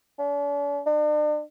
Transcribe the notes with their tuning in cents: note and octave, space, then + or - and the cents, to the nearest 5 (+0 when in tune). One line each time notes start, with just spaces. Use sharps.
D4 -45
D4 +40